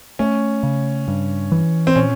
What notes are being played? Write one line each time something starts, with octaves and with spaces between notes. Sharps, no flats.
A3 C#4
C#3
G2
E3
C4
A#2 C#4